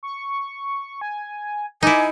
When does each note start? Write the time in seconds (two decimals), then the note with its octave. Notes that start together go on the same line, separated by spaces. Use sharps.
0.03 C#6
1.01 G#5
1.83 D#4 E4 G#5 D6